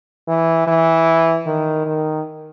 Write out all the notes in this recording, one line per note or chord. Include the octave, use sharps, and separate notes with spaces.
E3
E3
D#3
D#3